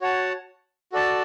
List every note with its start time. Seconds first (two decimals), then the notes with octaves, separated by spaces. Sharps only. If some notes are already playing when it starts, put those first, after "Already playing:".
0.01 F#4 C#5 F#5 A5
0.92 F#4 A4 D5 A5